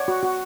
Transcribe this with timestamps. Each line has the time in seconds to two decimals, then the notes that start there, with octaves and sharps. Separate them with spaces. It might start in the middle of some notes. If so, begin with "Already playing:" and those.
Already playing: C#5 D5 F#5
0.08 F#4
0.23 F#4